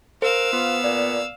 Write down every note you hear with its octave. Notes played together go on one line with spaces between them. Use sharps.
A#4 C5 F5 E6
B3 F4
A#2 D5